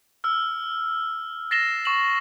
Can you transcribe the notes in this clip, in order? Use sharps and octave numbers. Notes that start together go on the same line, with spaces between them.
E6 F6
A6 A#6 C7 E7 G7
C#6 E7 F#7